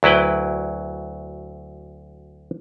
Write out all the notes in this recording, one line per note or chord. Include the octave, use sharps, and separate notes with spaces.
D2 F#3 E4 B4 G5